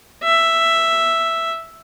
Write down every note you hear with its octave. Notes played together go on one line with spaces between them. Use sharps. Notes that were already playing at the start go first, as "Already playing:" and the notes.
E5